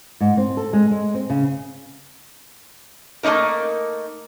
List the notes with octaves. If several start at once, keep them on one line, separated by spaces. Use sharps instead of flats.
G#2
C4
A4
G#3
G#3
C4
C#3
A3 A#3 C4 D#4 A#4